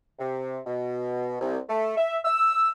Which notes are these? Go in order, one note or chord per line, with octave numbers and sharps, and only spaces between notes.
C3
B2
C2
A3
E5
E6